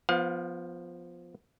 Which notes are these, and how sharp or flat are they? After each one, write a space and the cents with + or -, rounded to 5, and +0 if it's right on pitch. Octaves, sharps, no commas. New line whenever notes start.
F3 +0 B3 +0 F5 +40